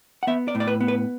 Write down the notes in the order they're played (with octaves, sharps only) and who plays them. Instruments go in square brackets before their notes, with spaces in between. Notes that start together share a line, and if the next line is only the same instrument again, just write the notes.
[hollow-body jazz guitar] F#5
B3 E5
D5
A2
D5
B4
B3
B4